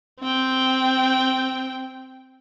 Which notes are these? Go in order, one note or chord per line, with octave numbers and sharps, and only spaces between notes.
C4 G5